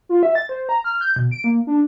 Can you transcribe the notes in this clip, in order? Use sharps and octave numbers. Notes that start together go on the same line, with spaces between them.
F4
E5
A6
C5
A#5
F6
G6
B2
D7
A#3
D4